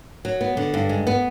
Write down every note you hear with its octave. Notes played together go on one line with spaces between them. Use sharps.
F#3
B3
D3
G2
G#3
B3